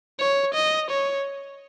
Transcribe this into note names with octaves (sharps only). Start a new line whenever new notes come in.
C#5
D#5
C#5